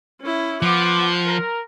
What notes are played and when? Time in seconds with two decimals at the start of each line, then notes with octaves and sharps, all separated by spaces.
0.21 C#4 E4
0.62 F3 B3 F#5 C6 D6
1.25 A#4